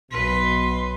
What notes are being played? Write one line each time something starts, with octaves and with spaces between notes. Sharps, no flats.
B1 B2 B4 C6